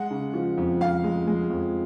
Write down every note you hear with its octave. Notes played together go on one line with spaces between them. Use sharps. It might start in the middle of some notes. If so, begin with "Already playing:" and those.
Already playing: G#3 F#5
C#3
F3
F2
F2 F5
G#3
G#3
F2